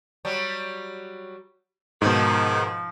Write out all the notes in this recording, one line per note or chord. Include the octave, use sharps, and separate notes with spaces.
F#3 G3
G#2 B2 D#3 F3 D#4